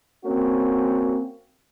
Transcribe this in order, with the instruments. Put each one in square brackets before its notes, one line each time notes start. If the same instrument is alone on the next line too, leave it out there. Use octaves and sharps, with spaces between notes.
[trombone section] A#3 C4 C#4 F#4